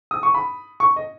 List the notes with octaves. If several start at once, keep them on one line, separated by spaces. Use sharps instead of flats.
D#6
C#6
B5
C#6
D#5